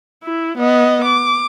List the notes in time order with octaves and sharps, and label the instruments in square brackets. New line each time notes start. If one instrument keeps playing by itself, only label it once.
[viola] E4
B3 D#5
D6